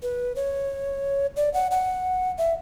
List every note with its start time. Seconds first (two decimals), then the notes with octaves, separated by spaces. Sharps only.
0.02 B4
0.36 C#5
1.37 D5
1.54 F#5
1.71 F#5
2.38 E5